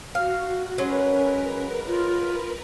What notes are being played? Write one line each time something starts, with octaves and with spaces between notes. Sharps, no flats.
F#4 F5
F#3 G#3 C#4 A#4 B4
F4